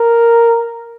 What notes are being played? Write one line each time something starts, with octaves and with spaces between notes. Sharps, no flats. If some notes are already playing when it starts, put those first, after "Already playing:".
Already playing: A#4